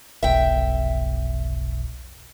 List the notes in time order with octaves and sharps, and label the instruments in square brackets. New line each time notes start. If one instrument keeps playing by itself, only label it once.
[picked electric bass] F1 B1 [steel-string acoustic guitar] E5 G5